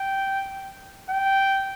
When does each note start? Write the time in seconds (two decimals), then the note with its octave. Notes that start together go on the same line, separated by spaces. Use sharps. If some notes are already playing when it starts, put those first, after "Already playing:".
Already playing: G5
1.10 G5